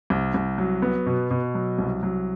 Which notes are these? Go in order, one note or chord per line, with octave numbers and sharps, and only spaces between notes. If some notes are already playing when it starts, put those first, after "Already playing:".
C2
C2
F#3
B3
B2
B2
F#3
C2
F#3